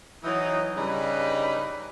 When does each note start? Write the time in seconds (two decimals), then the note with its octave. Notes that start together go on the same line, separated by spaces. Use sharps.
0.24 E3 F#3 D#4
0.77 G2 C#3 G3 D#4 B4 B5